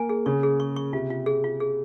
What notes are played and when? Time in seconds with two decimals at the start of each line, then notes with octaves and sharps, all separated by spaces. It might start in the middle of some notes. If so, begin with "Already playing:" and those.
Already playing: A#3 G#5
0.09 G#4
0.26 C#3 C#6
0.43 G#4
0.60 C#6
0.76 C#6
0.93 C3 F4
1.10 F4
1.26 G#4
1.44 F4
1.60 G#4